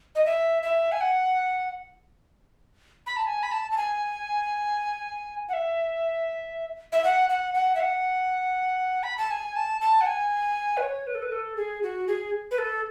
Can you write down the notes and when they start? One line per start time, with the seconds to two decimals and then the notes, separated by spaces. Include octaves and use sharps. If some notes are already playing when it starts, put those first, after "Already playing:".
0.15 D#5
0.26 E5
0.63 E5
0.92 G#5
1.01 F#5
3.07 B5
3.17 A5
3.27 G#5
3.43 B5
3.52 A5
3.71 A5
3.77 G#5
5.49 F#5
5.53 E5
6.92 E5
7.04 F#5
7.30 F#5
7.54 F#5
7.75 E5
7.80 F#5
9.03 B5
9.18 A5
9.31 G#5
9.56 A5
9.81 A5
10.01 F#5
10.06 G#5
10.77 B4
10.82 C#5
11.07 B4
11.15 A4
11.22 B4
11.32 A4
11.57 G#4
11.83 F#4
12.08 G#4
12.51 B4
12.58 A4